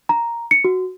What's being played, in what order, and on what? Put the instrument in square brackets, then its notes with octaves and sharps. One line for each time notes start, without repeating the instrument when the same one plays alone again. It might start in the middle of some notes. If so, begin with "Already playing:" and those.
[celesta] A#5
C#7
F#4